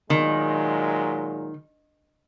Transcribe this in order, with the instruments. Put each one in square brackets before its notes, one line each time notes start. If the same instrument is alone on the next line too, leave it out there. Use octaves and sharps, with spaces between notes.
[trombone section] A#2 F#3 G#3 [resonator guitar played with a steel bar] D#3